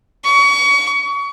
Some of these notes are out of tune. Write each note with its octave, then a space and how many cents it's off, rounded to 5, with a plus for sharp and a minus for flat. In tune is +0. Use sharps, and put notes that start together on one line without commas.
C#6 +30